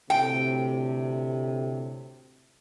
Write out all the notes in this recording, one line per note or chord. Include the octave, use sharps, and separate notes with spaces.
D2 A2 C3 G5